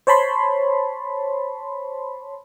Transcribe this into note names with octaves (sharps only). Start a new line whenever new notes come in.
C5 C#5 A5 B5 C6